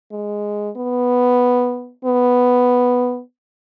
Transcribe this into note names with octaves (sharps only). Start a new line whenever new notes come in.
G#3
B3
B3